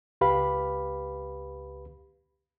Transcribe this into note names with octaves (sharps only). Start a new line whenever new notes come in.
C#2 G4 B4 F5 B5